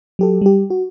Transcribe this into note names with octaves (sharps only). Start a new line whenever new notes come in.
F#3 G4 A4
G3 G4
F#4